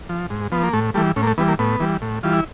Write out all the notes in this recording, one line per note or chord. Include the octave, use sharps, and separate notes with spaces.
F3
G#2
F3 B3
A#3
A2 A3
E3 G3 A3
A2 C#4
A#3
A3
E3 G3 B3
A#3
A2 B3
E3 G3
A2
E3 G3 F4
E4